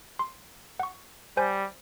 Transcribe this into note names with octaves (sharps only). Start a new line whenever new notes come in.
C6
F#5 C#6
G3 C5 G#5 G6